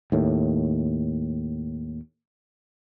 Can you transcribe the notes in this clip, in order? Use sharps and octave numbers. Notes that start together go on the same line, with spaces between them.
D#2 A2